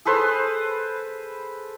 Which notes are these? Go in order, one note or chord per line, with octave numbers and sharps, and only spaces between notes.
G#4 A4 B4 C5